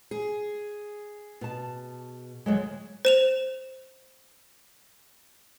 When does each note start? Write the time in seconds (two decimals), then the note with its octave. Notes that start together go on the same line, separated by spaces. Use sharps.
0.11 G#4
1.41 B2 A5
2.46 D2 F#3 G#3
3.05 C5 E7 F7